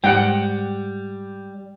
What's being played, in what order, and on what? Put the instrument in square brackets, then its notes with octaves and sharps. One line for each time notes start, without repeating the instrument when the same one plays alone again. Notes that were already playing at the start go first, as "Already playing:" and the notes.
[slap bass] G#2 [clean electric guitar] G3 [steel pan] F#5 G5